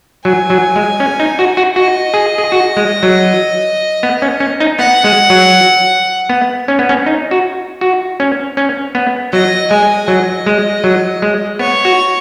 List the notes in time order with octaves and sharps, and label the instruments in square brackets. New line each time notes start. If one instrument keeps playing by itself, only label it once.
[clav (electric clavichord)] F#3 [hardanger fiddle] G#5
[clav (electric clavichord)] F#3
G#3
C#4
D#4
F#4
F#4
[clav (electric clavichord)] F#4 [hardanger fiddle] D#5
[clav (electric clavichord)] G#4
G#4
F#4
G#3
F#3
B3
C#4
C#4
D#4
[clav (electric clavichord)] B3 [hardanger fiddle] F#5
[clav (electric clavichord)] G#3
F#3
B3
C#4
B3
C#4
D#4
F#4
F#4
C#4
C#4
B3
[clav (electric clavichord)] F#3 [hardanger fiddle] D#5
[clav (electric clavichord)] G#3 [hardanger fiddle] G#5
[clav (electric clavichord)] F#3 [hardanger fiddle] D#5
[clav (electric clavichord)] G#3
F#3
G#3
[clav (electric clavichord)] B3 [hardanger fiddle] C#5
[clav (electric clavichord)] F#4